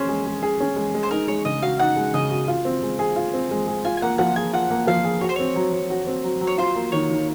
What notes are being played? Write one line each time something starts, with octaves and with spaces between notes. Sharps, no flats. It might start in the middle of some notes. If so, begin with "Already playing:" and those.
Already playing: C#4 G#4 C5
G#3
G#3
G#4
C#4
G#3
G#3
C5
D#4 A#4
G#3 C#5
C#3 D#5
F#4 F5
D#4 F#5
G#3
C#3 D#5
F#4
F4
C4
G#3
G#4
F4
C4
G#3
G#4
F4 G#5
G#5
A#3 F#5
F3 F#5
G#4 G#5
F4 F#5
A#3
F3 F5
G#4
F#4 C#5
C5
C4 C#5
F#3
F#3
F#4
C4
F#3
F#3
C#5
F4 C5
A#3
D#3 C#5
D#3